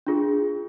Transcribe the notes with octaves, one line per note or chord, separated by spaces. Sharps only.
D4 F4 G#4